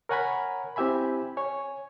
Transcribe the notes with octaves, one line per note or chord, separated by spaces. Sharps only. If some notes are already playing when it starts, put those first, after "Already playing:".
A#4 C#5 F#5 G#5 A#5 B5
C4 E4 G4 E5 G#5 B5
C#5 G#5